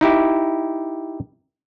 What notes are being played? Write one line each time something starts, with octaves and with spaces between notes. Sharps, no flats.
D#4 E4 G4